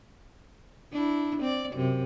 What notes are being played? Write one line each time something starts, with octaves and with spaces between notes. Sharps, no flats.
D4 E4
C4 D5
F#2 C3